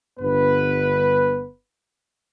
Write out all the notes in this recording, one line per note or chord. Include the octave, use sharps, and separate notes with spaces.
G1 G2 B3 B4